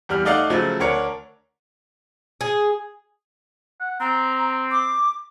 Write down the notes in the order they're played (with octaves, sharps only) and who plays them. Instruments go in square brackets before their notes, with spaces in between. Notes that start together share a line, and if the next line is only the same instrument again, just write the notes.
[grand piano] E2 G3 F6
A3 D#4 D5 F5 F#5
C#3 F3 F#3 A3
D2 D4 A#4 C#5 C#7
[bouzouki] G#4
[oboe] F#5
[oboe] C4 [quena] A#5
[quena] D6